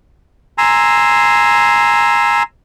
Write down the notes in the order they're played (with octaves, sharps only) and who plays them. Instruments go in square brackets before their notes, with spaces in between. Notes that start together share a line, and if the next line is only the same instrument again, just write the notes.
[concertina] G#5 A#5 C6 E6